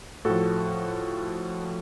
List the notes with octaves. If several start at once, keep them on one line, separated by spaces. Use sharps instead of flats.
A2 F3 F#4 A4